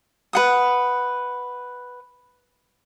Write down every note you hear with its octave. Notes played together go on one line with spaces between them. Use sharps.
B4 F#5 D#6